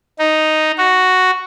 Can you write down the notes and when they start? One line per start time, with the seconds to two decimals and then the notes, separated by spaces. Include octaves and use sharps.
0.19 D#4
0.78 F#4